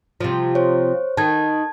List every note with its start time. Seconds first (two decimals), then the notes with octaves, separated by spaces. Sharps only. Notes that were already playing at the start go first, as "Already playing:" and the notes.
0.20 C3 F3
0.55 C5 C#5
1.17 D#3 A5 G#6